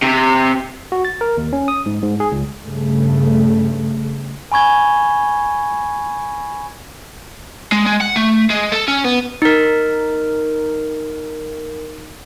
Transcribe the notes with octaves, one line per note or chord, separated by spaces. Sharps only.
C3
F#4
A6
A#4
D#2
C#4
D#6
G#2
G#2
G#4
C#2
G2 C#3 A3
G#5 B5 C#6 G#6 G7
G#3
G#3
F#5
A3
G#3
A4
C#4
B3
D#4 A#4